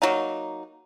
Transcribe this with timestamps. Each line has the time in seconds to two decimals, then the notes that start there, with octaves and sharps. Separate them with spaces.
0.02 F#3 A#3 D#4